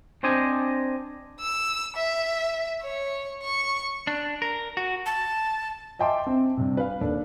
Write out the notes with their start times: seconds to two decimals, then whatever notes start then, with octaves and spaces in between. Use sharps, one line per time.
0.23 C4 D4 C5 D5 D#5 G#5
1.40 E6
1.96 E5
2.82 C#5
3.43 C#6
4.07 D4
4.42 A#4
4.77 F#4
5.06 A5
5.99 D#5 E5 G5 A5 C6 D6
6.27 C4
6.57 G2 C3
6.77 B4 F5
7.01 D#2 D4 A4